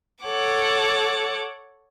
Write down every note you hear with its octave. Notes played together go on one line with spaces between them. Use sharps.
A4 C#5 F#5 D6